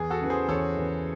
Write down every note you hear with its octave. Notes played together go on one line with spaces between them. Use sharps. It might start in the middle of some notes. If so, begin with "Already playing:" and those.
Already playing: E2 G#4
F#4 A4
C#3 E3
G#4 C5
E2 A4 C#5
C#3 E3